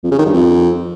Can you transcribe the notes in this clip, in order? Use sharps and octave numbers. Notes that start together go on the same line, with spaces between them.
F2
C#3
D#3
G2
F2